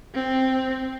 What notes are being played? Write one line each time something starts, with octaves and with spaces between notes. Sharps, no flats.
C4